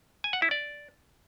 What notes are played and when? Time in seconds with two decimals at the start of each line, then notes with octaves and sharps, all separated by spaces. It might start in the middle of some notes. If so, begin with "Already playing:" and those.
0.24 G#5
0.33 F#5
0.42 E4
0.51 D5